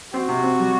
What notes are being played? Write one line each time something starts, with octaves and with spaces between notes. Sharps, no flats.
C4 F#4
C3
C4
G3